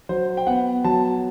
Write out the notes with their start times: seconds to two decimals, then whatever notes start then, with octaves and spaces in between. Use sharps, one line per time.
0.09 F#3 C5
0.37 G5
0.47 B3 F#5
0.84 F#3 A5